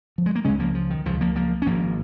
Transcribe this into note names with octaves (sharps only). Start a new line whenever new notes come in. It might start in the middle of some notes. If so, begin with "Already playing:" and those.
F3
G#3
A#3
C#2 C#3 G#3 C#4
F3 A#3
F3
D#3
C#2 C#3 F3
F3 A#3
F3 A#3
C#4
G#1 G#2 F3 A#3